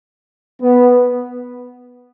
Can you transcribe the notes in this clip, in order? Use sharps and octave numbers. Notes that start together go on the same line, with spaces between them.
B3